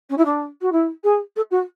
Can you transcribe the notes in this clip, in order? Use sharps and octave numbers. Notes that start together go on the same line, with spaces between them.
C#4
E4
D4
F#4
E4
G#4
A4
F#4